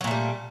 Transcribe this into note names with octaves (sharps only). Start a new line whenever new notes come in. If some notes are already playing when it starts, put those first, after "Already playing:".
A#2 F#3 G3 A3